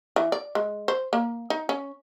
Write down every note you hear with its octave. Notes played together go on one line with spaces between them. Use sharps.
E3
D5
G#3
C5
A#3
D#4
C#4